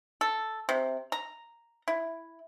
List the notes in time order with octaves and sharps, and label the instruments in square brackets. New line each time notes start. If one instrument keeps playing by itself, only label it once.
[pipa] A4
C3
A#5
E4